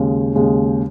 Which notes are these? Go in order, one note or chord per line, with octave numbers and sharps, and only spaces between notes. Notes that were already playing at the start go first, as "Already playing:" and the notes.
Already playing: D#2 C#3 G#3
D#2 C#3 G#3